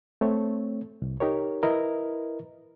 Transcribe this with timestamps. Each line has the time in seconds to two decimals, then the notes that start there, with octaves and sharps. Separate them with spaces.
0.21 A3 C4 C#5
1.02 C2
1.20 D#4 G4 A#4 C#5
1.63 E4 A#4 B4 D#5